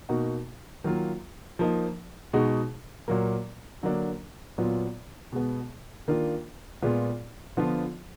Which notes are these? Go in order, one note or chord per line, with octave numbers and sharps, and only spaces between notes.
B2 A#3 D#4 F#4
D#3 F#3 A#3 F4
F3 A#3 D#4
B2 G#3 D#4 F#4
A#2 F#3 A#3
D3 F#3 A#3 D4
A#2 F#3 B3 F4
B2 G#3 B3
D#3 A#3 D4 F4
A#2 G#3 B3 F4
D3 F3 B3 F4